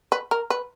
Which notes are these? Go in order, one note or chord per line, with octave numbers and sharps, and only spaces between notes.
B4
A#4
B4